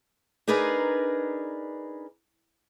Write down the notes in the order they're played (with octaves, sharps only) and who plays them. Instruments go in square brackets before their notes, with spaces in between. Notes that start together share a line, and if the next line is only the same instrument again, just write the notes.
[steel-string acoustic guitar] D4 D#4 G#4 A#4 B4 D5